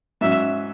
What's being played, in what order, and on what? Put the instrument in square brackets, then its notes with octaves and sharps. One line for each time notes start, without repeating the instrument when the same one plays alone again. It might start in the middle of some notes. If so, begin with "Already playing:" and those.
[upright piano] G#2 F#3 C#4 [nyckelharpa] E5